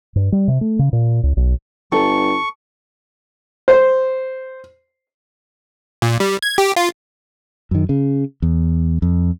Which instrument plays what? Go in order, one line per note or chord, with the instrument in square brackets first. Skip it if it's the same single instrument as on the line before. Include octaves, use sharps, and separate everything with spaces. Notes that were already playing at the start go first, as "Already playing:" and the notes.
[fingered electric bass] G2
G3
C3
A3
C#3
A#2
C#2
B1
[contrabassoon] G1 [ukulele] A4 [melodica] C#6
[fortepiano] C5
[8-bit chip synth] A#2
G3
G#6
G4
F4
[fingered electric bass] F#2 D#3
C#3
E2
F2